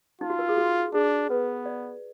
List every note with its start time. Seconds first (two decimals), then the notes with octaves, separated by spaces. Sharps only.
0.21 D#4 F4
0.30 F#4
0.39 A#4
0.49 G#4
0.57 F#4
0.93 D4 G#4
1.30 B3 B4
1.66 D5